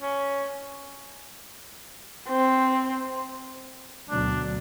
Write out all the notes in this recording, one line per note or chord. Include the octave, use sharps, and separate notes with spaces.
C#4
C4
D2 B2 F#3 D4